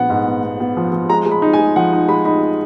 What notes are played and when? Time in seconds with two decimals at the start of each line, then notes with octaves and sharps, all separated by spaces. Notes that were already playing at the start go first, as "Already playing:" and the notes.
Already playing: A#1 B3 F#5
0.10 G#2
0.27 B3
0.43 B3
0.60 B3
0.77 F3
0.93 F3
1.09 G#3 A#5
1.26 G#3
1.31 B5
1.42 D#4
1.53 G#5
1.59 G#3
1.76 F3 F#5
1.93 D#4
2.09 G#3 B5
2.25 D#4 B5